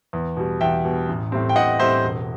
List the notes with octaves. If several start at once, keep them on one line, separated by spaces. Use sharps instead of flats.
E2
B2 G3
E2 E5 G5
B2 G3
A1
A2 G3 C4
G5
A1 D#5 F#5
A2 G3 C4 C5 E5
E1